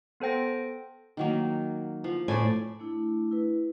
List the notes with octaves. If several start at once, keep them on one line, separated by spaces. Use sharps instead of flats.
B3 A4 C5 G5 A#6
D#3 F#3 A#3
F3
A2 C5 D5 G#5
A3 D4 E4
E4 B4